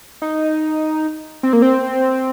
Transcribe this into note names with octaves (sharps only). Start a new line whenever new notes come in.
D#4
C4
A#3
C4